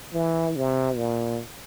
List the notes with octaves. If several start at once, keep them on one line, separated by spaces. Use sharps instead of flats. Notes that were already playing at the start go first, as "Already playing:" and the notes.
E3
C3
A#2